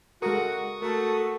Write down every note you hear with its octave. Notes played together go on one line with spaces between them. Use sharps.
G#3 F#4 A4 A#4 C#6 D#6
A3 F#4 A4 A#4